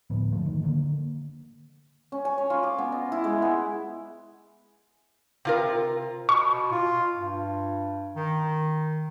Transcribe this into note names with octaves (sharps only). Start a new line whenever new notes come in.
D2 A2 F3 B3
G2 D3 F3 A3
D#3
D3 A#3
C#4
G#5
C#5
F4
D6
B3
D#5
E4
G#3
B3
C3 F4 A#4
B2 C#6
F4
G2
D#3